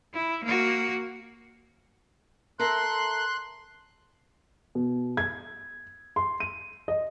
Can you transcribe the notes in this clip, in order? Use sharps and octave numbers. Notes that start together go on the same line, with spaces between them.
E4
A#3 F#4
A4 A#4 E5 C6 F#6
B2
G#6
C6
D#7
D#5